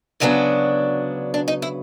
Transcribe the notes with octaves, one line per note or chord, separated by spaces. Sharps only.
D2 C#3 F#3 B3 D4 D#4
D4
D#4
E4